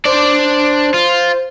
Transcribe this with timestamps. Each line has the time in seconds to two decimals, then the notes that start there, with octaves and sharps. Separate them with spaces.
0.06 D4 C5 D5
0.94 F4